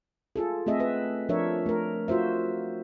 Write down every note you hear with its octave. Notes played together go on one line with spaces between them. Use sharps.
F4 G#4 A4
A3 C4 G#4 D#5 E5
B4 E5
F3 D4 A#4 C#5 E5
A3 A#4
F4 F#4 C5 E5